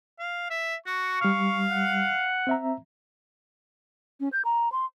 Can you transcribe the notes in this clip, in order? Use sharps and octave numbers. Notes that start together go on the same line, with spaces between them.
F5
E5
F#4 C#6
G3 F5 F6
F#5
C4 E5 A#5
C#4
G6
A#5
C6